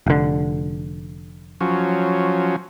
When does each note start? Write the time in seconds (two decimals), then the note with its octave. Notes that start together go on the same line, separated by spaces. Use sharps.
0.06 F1 D3
1.61 F3 F#3 C#4